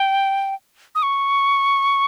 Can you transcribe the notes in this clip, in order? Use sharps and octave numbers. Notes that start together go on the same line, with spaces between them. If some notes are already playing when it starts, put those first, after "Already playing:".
Already playing: G5
D#6
C#6